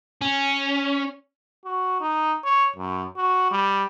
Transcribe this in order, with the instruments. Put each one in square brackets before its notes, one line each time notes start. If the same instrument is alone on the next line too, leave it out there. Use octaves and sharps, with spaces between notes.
[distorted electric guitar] C#4
[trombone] F#4
D#4
C#5
F#2
F#4
G3